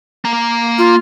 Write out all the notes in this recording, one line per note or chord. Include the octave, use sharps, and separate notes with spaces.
A#3 A#5
F4